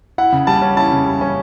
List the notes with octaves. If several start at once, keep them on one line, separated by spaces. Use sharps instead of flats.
E4 F#5
C#3
G3 A5
C#4
E4 A5
C#3
G3
C#4